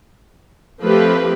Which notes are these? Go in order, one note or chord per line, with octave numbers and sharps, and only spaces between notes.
F3 A3 C4 G4 B4